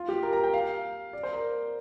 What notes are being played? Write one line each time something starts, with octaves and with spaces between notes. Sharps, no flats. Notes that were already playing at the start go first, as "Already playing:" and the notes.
Already playing: F4
G4
A#4
A#5
G5
F5
D5
C5
A#4